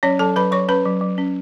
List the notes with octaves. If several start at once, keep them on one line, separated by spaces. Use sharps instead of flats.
F#3 C#4 C#5
F#3 A4 A5
F#3 B4 B5
F#3 C#5 C#6
C#4 B4 B5
F#3
F#3
C#4